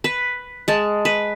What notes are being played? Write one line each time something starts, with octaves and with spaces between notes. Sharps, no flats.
B4
G#3 A5
B4